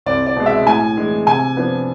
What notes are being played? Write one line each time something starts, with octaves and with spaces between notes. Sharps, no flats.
C2 D5
D5
B2 G#3
E5
A2 G#5
E3 G#3 D4
C3 G#5
F3 B3 D4